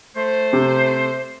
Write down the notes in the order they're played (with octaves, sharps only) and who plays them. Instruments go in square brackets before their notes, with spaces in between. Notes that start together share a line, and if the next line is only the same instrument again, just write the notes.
[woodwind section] A3 C5
[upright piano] C3